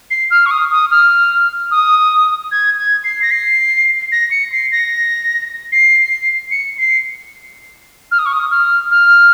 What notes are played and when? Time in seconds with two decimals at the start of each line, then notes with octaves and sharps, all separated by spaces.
0.10 C7
0.31 F6
0.46 C#6
0.51 D#6
0.71 D#6
0.91 F6
1.71 D#6
2.51 G#6
2.78 G#6
3.04 C7
3.22 A#6
3.31 C7
4.12 A#6
4.31 C#7
4.52 C7
4.72 A#6
5.72 C7
6.51 C#7
6.78 C7
8.11 F6
8.19 D#6
8.26 C#6
8.33 D#6
8.51 F6
8.91 F6